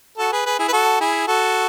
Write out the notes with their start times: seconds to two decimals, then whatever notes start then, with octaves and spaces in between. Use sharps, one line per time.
0.18 F#4 A4
0.32 G#4 B4
0.46 G#4 B4
0.59 E4 G#4
0.68 B4
0.72 F#4 A4
1.00 E4 G#4
1.27 F#4 A4